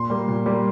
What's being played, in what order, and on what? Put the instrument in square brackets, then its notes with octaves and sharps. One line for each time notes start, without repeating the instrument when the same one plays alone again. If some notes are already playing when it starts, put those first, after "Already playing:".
Already playing: [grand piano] A#2 C6
G3 A#3
A#2
G3 A#3